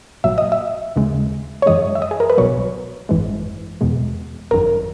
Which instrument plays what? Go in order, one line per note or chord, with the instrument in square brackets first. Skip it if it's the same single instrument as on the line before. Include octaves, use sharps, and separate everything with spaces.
[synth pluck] A#1 A#2 F#3 E5
D#5
E5
D#2 C#3 G#3
C#5
F#2 E3 G#3 D#5
E5
D#5
G#4
A#4
B4
B1 B2 F#3 C#5
G#1 F#2 E3 G#3
E2 B2 G#3
G#1 F#2 D#3 A#4